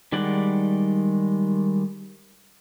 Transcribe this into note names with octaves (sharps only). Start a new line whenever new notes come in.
D#3 G3 G#3 D5 F#5